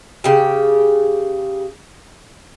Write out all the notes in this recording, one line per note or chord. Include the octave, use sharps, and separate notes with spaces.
C#3 G4